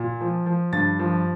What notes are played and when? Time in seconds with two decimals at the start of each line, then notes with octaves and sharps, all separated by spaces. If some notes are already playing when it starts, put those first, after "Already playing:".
Already playing: A#2
0.21 F3
0.46 F3
0.72 G2 A6
0.99 F3